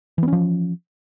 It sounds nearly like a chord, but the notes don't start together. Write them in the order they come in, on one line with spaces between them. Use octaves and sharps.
E3 B3 C#4 F3